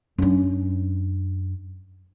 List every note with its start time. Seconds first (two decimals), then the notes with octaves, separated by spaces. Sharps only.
0.18 F#2 D4